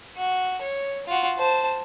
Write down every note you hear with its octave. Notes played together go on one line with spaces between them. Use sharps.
F#4
C#5
F4 F#4
C5 A5